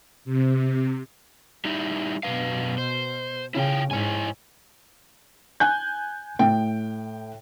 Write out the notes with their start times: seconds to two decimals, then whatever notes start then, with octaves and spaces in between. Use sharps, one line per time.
0.25 C3
1.65 G3 D#4 E4
2.23 F#2 B2 B4 F5
2.78 C5
3.55 C#3 E4 F4 G5
3.91 G#2 E4 C#5 G#5
5.60 G#5 F#6 G6
6.39 A2 G5